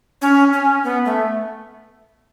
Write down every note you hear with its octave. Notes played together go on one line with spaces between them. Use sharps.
C#4
C#4
B3
A3